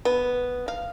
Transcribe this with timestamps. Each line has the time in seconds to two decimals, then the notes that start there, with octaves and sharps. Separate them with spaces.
0.05 B3
0.68 F5